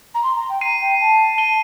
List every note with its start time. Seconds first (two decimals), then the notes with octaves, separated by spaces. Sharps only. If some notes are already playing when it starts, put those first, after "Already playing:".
0.14 A#5
0.23 C6
0.35 A#5
0.49 G5
0.61 A#5 C7 D#7
0.80 G5
1.00 A5
1.38 D#7 G7